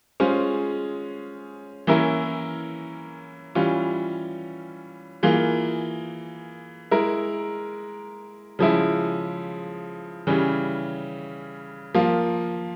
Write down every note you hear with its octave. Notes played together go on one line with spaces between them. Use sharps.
G#3 C#4 F4 G#4 C5
E3 A#3 C#4 E4 A#4
E3 G3 C#4 F4
E3 A#3 F4 G#4
G#3 E4 A#4
C#3 F3 G#3 E4
C#3 E3 G3 C#4
F3 A#3 F4